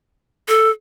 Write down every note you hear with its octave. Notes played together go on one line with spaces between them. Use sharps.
A4